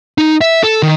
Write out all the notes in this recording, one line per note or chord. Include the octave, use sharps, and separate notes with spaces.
D#4
E5
A4
D#3